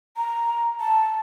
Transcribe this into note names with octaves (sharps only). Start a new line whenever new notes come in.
A#5
A5